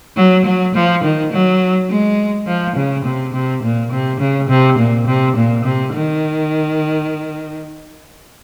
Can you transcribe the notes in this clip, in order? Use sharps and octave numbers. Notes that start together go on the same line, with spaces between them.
F#3
F#3
F3
D#3
F#3
G#3
F3
C#3
C3
C3
A#2
C3
C#3
C3
A#2
C3
A#2
C3
D#3